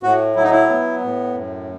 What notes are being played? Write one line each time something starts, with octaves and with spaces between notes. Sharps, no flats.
A2 F#4
F#3 E4
D#4
E4
B3
A2
F#2